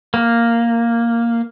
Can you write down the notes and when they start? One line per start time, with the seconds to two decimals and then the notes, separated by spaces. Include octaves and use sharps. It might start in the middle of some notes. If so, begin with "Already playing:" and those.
0.14 A#3